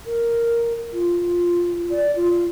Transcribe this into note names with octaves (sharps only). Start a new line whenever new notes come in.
A#4
F4
D5
F4